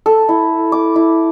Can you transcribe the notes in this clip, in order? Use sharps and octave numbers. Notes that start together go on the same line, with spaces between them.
A4
E4
D6
E4